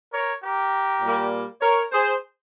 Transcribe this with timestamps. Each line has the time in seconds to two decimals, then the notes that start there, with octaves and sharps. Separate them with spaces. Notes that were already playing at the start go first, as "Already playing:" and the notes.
0.12 A#4 C#5
0.43 G4 A#4
1.02 A#2 G3 A#3
1.61 A#4 C#5
1.92 G#4 C5